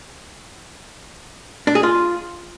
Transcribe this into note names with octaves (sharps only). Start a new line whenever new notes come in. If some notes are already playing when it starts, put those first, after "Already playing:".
D4
G#4
F4